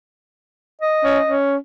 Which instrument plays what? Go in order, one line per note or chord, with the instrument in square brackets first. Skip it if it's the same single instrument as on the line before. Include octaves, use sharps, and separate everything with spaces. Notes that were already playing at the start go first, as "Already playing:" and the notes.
[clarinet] D#5
[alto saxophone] C#4
C#4